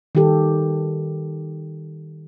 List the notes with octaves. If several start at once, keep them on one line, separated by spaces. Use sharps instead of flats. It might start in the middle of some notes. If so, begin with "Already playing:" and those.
D#3 G3 G4 A4